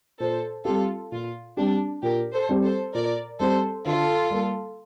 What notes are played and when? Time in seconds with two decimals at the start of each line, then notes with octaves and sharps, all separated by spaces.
0.19 A#2 A4 C5
0.65 G3 C4 F4 G4 A4
1.12 A#2 F4
1.57 G3 C4 D4 G4
2.02 A#2 G4 A#4
2.33 A4 C5
2.49 G3 C4 G4
2.63 A4 C5
2.94 A#2 A#4 D5
3.40 G3 C4 G4 A4 C5
3.85 D3 F4 A4
4.30 G3 A#3